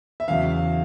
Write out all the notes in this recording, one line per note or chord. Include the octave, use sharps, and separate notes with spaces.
E5
E2 C#3 F#3 F5